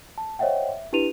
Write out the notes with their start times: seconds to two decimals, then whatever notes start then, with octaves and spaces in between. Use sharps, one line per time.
0.18 A5
0.39 C5 C#5 D#5 E5 F#5 G5
0.69 E5
0.93 D4 E4 G4 B4 D#7 F7